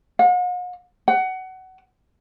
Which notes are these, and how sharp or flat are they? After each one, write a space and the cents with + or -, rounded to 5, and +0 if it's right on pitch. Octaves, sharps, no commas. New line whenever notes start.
F#5 -45
F#5 +20